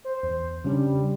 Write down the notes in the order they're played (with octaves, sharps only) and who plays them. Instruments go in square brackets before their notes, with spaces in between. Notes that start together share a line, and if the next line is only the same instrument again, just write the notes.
[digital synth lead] C5
[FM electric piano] E2
[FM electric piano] C#3 C#4 D4 [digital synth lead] G3